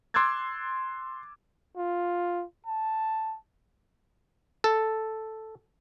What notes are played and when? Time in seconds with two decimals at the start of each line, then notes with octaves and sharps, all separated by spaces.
0.14 C6 D6 E6 F#6 G#6 A6
1.77 F4
2.66 A5
4.64 A4